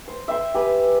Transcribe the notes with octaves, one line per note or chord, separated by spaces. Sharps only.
C5
E5 G5 C6
G4 G#4 B4